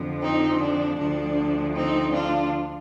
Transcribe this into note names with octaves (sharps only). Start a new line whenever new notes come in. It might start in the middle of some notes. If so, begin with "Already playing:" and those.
Already playing: F2 D3 F3
C4 D#4
D4
D2 D3 F3 D4
C4 D#4
D4 F4